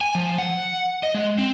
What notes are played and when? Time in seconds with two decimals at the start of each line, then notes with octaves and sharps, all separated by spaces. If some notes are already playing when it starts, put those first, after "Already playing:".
0.01 G#5
0.15 F3
0.38 F#5
1.03 D#5
1.15 G#3
1.38 C4